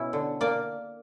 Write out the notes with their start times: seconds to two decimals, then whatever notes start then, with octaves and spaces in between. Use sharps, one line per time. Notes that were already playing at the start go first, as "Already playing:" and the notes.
Already playing: B2 C#4 E4
0.13 D3
0.41 A#3 D5